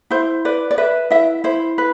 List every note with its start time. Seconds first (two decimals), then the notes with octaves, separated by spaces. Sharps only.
0.11 E4 C5
0.45 B4 D5
0.71 D5
0.78 B4 E5
1.10 E4 E5
1.44 E4 C5
1.78 B4